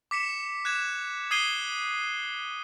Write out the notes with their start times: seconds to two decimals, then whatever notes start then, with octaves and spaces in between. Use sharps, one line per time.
0.11 D6 B6 C#7 E7
0.65 F#6 G#6 E7
1.31 D#6 G#6 C7 D#7 G7